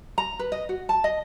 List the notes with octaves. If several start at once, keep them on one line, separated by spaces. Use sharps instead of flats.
A#5
B4
D#5
F#4
A5
D#5